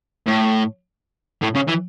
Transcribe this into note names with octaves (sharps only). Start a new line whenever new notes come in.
A2
A2
C#3
E3